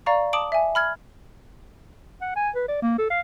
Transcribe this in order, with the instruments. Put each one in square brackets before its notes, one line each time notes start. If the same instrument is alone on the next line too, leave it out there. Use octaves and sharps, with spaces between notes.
[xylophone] D5 F5 A#5 C#6
A5 D6 D#6 D7 F#7
E5 G#5
B5 F6 G#6
[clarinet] F#5
G#5
B4
D5
A#3
A4
F5